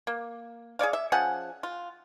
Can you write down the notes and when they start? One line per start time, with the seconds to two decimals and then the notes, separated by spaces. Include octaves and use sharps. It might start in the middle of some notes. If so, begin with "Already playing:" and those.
0.07 A#3
0.79 G#4 C#5 D5 F5
0.93 E5
1.12 F3 C#4 G#4 F#5
1.63 F4